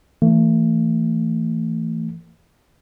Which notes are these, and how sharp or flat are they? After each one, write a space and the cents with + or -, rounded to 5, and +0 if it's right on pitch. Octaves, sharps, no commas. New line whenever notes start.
E3 +0 A3 +35